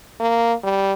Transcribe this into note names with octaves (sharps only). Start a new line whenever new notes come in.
A#3
G3